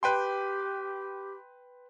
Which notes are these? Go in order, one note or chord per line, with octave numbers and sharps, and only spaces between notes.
G4 B4 G5 C6